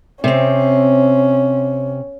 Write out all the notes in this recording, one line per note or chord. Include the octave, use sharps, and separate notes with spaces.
C3 C4 C#4